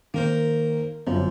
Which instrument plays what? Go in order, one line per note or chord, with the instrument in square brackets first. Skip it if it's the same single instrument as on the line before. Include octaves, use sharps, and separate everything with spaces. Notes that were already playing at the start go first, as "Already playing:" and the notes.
[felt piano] D#3 [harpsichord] A#3 A#4 C5
[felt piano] G1 F#2 [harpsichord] F3